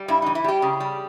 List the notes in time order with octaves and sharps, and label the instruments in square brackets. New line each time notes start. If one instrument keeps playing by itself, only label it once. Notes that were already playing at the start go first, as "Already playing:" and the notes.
Already playing: [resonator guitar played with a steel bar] G3
G2 E4
E3 D#4
E4
G3 G4
C#3
G3